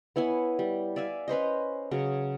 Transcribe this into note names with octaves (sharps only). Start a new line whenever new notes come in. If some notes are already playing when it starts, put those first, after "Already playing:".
B3 E4 C#5 G#5
G3
D5 E5 F5 G#5
C#4 B4 C5 D#5
C#3 F#3